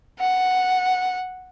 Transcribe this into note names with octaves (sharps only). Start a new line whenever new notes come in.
F#5